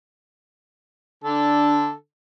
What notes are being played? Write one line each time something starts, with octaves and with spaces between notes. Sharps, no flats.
D3 D4 A4